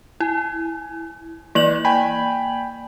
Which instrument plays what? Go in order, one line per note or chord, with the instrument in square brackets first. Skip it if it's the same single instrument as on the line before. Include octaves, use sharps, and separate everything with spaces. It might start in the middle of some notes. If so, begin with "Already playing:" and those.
[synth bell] E4 [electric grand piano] G#5
[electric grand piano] E3 [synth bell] A#3 D5 F#7
[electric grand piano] G5 G#5 B5